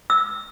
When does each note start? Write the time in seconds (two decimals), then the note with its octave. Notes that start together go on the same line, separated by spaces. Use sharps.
0.10 E6